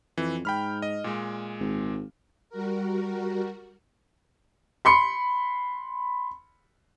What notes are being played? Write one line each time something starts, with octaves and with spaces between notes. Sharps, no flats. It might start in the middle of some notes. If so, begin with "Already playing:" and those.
F2 E3
G#2 G5 B5 F6
D#5
A#2 G#3
G#1
G3 F#4 A#4
B5 C6 C#7